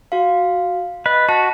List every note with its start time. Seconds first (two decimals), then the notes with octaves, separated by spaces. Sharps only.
0.12 F#4 F5
1.06 B4 D#5
1.29 F#4 A5